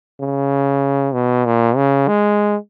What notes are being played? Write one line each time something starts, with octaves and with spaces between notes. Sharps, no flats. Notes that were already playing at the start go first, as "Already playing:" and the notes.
C#3
B2
A#2
C#3
G#3